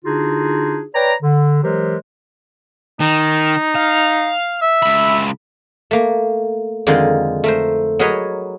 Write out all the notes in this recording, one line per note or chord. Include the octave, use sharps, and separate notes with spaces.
D3 D4 D#4 F4 F#4 G#4
B4 C#5 D5 G5 A#5
D3
E3 F#3 G#3 G4 A#4 C5
D#3 D#4
F5
E5
C#2 B5
A3 A#3
F2 D3 D#3 G#3 D#4 F4
A3 A#4 C5
F#3 G#4 A#4 B4 C#5 D#5